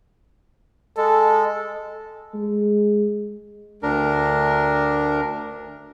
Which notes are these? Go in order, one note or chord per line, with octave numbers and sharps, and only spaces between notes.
G#3 A4
G#3
D2 D4 A#4